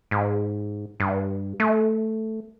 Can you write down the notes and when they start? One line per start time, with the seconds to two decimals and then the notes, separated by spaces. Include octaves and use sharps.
0.11 G#2
1.00 G2
1.60 A3